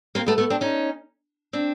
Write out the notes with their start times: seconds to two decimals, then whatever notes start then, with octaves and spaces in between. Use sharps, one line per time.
0.15 A#3 C4
0.26 A3 B3
0.38 A3 B3
0.50 C4 D4
0.61 C#4 D#4
1.53 C4 D4